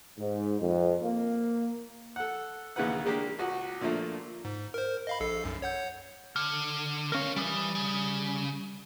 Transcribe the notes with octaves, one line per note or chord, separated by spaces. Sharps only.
G#2
F2
A#3
A4 F#5
A#1 D#2 C#3 E3 B4 F#5
C#3 G#3 A#3 D4 G4
C#2 F#4
A#2 D3 F3 A3 A#3
G#2
A#4 C5
D#5 F5 B5
A#1 A4 C7
B1 F#2
C#5 F#5 G6
D3 F6
G3 C#4 A#4 F5
E3 G3 D#6
C#3